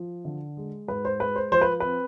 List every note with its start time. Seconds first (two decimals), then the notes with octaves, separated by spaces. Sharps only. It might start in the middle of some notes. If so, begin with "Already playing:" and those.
Already playing: F3
0.25 D3
0.57 G#3
0.88 G#2 B4
1.05 C5
1.20 G#3 B4
1.36 C5
1.52 F3 C5
1.61 B4
1.80 C4 B4